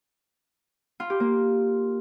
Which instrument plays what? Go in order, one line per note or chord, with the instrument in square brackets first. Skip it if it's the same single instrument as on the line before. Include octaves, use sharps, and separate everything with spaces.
[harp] F4
G4
A#3